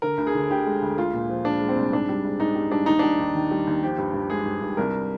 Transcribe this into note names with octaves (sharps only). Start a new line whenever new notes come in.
D3 A#4
D2
G#4
D3
D2 G4
G#3
D2
G#3 F4
A#2
F3
G#3 D4
G#3
C4
C2
G#2 D4
G3
G#2
G#2 D#4
G3
G3 D4
D#2 D#4
G3 D4
D#2
D#3
G3
D#2
F3 G4
G2
G2
G#3 G#4
G2
G2
C2 A#4